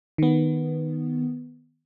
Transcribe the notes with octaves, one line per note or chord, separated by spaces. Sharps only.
D#3 B3